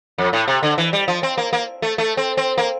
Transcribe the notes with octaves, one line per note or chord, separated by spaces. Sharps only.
F2
A2
C3
D3
E3
G3
F3
C4
A#3
A#3
A3
A3
C4
C4
A#3